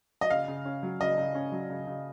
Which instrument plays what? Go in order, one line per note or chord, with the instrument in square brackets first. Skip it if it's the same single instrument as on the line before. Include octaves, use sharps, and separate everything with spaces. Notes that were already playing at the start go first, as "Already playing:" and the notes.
[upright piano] D#5
[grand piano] C#3 [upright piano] F5
[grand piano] C#3
C#4
F#3
[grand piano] C#3 [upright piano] D#5
[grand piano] C#3
C#4
F#3
C#3
C#3